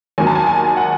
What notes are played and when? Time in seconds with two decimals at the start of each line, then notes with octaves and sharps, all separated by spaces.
0.18 D#2 D#3 F#3 G#5
0.27 A5
0.35 G#5
0.47 G#5
0.77 F#5